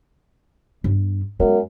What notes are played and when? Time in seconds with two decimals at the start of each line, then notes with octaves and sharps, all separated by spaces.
0.84 G2 B3
1.40 F#2 G#3 B3